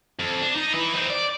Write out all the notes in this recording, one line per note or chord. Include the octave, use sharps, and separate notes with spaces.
F2
D4
D#4
E4 B4
C4 D#4
D5